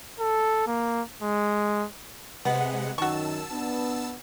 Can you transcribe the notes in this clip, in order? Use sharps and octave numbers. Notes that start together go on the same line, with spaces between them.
A4
A#3
G#3
C3 G#3 B3 F#5
F#2 D#3 F#4 A5 C#6 E6
B3 D4